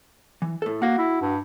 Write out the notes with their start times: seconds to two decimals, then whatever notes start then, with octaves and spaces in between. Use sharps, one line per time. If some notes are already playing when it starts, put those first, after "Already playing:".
0.42 E3
0.62 A2 A4
0.82 A#3 F#4 F#5
0.98 E4
1.21 G2